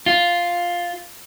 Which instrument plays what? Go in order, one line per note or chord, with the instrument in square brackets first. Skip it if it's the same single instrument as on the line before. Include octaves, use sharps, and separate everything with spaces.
[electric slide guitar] F4